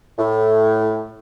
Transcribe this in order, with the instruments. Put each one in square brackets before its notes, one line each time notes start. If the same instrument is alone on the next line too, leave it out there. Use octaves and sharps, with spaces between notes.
[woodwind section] A2